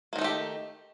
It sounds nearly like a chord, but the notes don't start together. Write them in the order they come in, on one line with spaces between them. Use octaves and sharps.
A#3 D#3 D#4 A3 G4